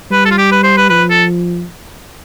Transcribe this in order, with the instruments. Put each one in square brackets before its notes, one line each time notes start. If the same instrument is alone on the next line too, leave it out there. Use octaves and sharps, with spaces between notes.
[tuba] G3 [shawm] B4
[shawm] A4
F4
G4
B4
C5
B4
[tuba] F3 [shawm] B4
[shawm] A4